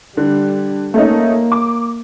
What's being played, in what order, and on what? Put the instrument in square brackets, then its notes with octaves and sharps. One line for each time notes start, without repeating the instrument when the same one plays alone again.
[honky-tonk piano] D3 [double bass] G3
[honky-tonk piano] A3 C#4 D#4 [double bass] A#3
[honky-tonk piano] D6